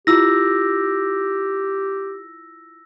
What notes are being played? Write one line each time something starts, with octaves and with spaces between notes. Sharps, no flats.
E4 F4 G4 E6 A#6